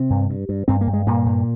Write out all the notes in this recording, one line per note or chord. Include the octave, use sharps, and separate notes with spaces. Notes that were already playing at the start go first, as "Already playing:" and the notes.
Already playing: C3 C4
G2
G2
G2
G2 C4
A#3
G2
G#3
G2 A#2 A#3
G2